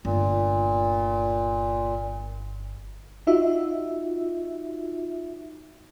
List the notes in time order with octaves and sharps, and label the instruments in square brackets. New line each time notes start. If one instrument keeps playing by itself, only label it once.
[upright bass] G1 [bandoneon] A#2
[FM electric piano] D#4 F4 F#4 E5